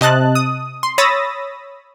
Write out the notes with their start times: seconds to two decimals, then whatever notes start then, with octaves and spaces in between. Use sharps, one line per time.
0.01 C3 D#5 A5 F#6
0.35 D#6
0.83 C6
0.98 C#5 B5 D#6 E6 A6 A#6